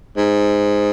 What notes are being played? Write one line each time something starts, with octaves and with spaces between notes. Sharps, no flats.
G#2